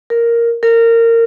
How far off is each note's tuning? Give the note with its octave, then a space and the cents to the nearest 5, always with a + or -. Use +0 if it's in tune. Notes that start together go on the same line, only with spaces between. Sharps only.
A#4 +0
A#4 -20